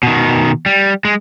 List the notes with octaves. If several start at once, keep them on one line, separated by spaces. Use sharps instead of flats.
B2 D#3
G3
G#3